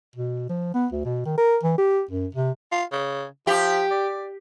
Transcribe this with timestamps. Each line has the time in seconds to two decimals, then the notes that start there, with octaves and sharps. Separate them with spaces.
0.16 B2
0.49 F3
0.74 B3
0.92 D2
1.05 B2
1.26 D#3
1.38 A#4
1.63 E3
1.78 G4
2.11 F#2
2.35 C3
2.72 F4
2.92 C#3
3.47 F3 G4
3.91 D5